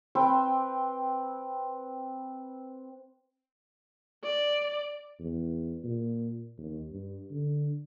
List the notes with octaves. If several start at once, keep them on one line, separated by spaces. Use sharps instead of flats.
C4 B4 G5
D5
E2
A#2
D#2
G2
D3